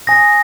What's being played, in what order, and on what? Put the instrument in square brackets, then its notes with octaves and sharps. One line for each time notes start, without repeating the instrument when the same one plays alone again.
[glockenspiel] G#5 D#6 A#6